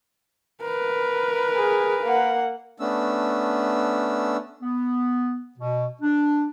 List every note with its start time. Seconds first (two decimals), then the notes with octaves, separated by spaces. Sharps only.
0.62 A#4 B4
1.57 G#4
2.04 A#3 F#5
2.80 A3 B3 C#4 D4 E6
4.61 B3
5.58 B2
6.01 D4